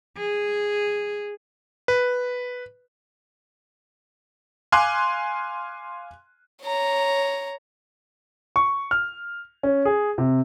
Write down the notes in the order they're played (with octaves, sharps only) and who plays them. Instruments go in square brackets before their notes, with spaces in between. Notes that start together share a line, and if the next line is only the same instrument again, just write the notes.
[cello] G#4
[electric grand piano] B4
[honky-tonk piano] F5 G#5 C6 D6 F#6
[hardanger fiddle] C#5 A#5
[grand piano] C#6
F6
C#4
G#4
C3